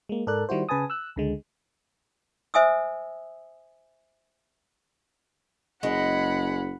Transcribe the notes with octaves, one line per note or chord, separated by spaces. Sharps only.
G#3 A#3
G#2 A4 A#4 D5 F#6
D#3 G3 E4 F#4 C5
C#3 B4 G#5 A5 D#6
E6 F#6
C#2 D3 G#3
C5 E5 G#5 D#6 E6
F#1 G#3 F#5 B5